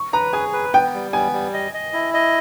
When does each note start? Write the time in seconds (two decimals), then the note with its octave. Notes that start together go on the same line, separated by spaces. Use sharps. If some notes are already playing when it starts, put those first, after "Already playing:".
Already playing: C#6
0.13 B4 A#5
0.33 G#4 G#5
0.53 B4
0.74 B3 G5
0.94 G3
1.13 B3 G#5
1.34 G3
1.53 D#5
1.74 D#5
1.93 E4
2.14 D#5